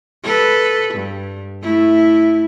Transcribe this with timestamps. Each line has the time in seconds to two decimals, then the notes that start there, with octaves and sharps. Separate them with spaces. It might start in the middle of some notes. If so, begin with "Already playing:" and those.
0.24 A4 B4
0.94 G2
1.62 A3 E4